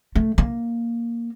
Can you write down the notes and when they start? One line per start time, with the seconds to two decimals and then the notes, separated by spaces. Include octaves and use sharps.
0.15 A3
0.38 A#3